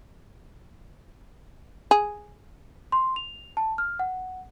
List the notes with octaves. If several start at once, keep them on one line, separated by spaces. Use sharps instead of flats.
G#4
C6
F7
A5
F6
F#5